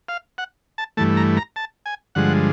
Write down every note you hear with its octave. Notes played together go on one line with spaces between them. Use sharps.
F5
F#5
A5
G2 E3 A3 A5
A#5
A#5
A5
G#5
G2 D3 F3 G#3 F#5